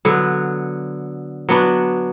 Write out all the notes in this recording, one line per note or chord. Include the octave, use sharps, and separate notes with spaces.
D3 F#3 B3
F#3 B3 D4 F#4